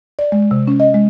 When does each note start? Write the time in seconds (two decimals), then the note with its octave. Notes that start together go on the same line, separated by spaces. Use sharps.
0.19 D5
0.32 G#3
0.51 C3
0.67 C#4
0.80 D#5
0.94 G#3